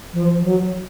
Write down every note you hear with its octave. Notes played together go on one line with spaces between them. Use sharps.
F3
F3
F#3